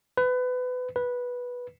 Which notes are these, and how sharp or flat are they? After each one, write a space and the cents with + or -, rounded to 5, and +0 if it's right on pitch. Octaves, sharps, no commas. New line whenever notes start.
B4 +25
B4 -10